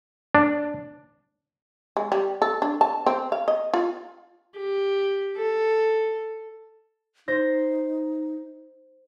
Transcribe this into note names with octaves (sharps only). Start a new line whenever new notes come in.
D4
G#3
G3
A4
D4
A5
C4
F5
D#5
F4
G4
A4
D#4 C5 A#6